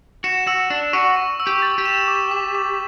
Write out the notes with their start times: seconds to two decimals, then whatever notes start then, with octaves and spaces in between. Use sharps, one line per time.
0.24 F#4 E7
0.47 F#4 E6
0.70 D4 E7
0.93 F#4 C#6
1.16 C#6
1.40 E6
1.47 G4
1.62 A6
1.78 G4
1.85 E7
2.08 D6
2.31 D6
2.55 D6